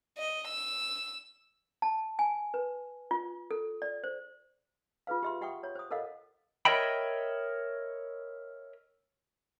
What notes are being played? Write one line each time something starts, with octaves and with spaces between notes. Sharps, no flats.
D#5
E6
A5
G#5
B4
F4
A4
D5
C5
F4 G#4 B4 F5
G4 E5 C6
G4 E5 F#5 G5 C#6 D#6
C#5
C5 D#6
A4 A#4 D#5 F5 F#5
A#4 C#5 D#5 E5 G5 B5